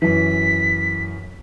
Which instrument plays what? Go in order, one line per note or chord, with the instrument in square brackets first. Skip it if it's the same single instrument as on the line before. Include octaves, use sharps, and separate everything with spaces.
[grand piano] F#2 E3 [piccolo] B6